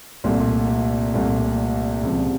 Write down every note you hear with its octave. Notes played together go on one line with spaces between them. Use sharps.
C2 A#2 A3
C2 A#2 A3
C#2 C3 F3